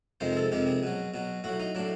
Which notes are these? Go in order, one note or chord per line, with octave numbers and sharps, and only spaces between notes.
F2 C3 D#3 G#3 C5
G#4
A4
F2 C3 D#3 G#3 G4
G#4
B2 F#3
B2 F#3
A2 F#3 F#4
D#4
A2 F#3 D4